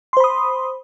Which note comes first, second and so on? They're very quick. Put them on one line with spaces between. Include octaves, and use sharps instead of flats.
C6 C5 B5 D#6